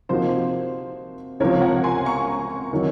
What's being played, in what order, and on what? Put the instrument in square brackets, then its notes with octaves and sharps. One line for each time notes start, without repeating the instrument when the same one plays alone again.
[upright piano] C3 F3 A#3 D#4 F#4 [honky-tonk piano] C5
[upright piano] C#2 C3 F3 [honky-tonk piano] A#4 C#5
[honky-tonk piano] F#5 A#5
G#5 C6
A#5 C#6
[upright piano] D#3 F#3 C4